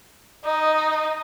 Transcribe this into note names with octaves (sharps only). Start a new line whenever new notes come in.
D#4 D#5